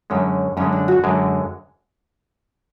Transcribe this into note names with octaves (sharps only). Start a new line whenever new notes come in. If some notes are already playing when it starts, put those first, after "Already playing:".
F#2 D3 G#3 C#4
F#2 D3 G#3 C#4
D4
F#4
F#2 D3 G#3